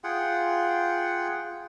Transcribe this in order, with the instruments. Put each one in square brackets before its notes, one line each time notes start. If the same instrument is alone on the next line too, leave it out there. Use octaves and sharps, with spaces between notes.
[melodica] F4 G#4 F#5 G5